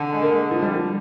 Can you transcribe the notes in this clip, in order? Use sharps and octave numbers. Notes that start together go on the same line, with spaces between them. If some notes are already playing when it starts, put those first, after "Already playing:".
Already playing: D3
G#3
A#3
G#3
F3
G3
F3